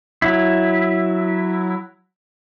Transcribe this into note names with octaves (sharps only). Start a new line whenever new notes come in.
F#3 E4